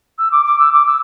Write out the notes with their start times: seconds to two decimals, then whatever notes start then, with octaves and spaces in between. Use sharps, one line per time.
0.18 E6
0.32 D6
0.46 D6
0.59 E6
0.73 D6
0.86 E6